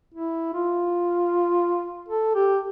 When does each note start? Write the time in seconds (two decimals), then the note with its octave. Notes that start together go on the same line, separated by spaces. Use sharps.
0.14 E4
0.54 F4
2.08 A4
2.35 G4